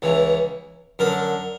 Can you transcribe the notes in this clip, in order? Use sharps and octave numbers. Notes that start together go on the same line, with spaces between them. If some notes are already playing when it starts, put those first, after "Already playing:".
C#2 C#3 E3
F#2 D3 A#4